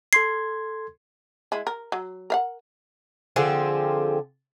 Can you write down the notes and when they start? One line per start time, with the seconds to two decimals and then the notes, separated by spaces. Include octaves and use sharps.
0.13 A4 C6 G#6 C7
1.52 G#3 E4
1.67 A#4
1.92 F#3
2.30 A#4 F5 F#5
3.36 D3 F3 C4 G#4